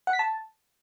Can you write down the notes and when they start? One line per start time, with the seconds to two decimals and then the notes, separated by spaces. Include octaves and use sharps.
0.07 F#5
0.13 B6
0.19 A5